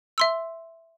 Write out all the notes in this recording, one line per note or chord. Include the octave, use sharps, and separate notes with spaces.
E5 C6 E6